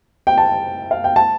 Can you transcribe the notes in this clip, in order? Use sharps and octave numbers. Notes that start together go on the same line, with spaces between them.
G5
A5
F5
G5
A5